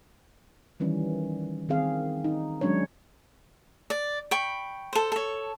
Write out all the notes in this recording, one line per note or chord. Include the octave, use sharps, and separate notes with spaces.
D#3 E3 G3 C#4
D#3 C4 G#4 F5
D#4
F#3 G#3 C#4 D4 C#5
D5
G5 B5 C#6
A4 C5
A4 C#5